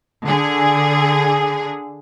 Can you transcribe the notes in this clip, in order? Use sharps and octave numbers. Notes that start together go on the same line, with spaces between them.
D3 G#4